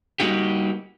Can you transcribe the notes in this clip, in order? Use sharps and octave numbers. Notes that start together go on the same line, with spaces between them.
G3 A#3 D#4 F#4 G4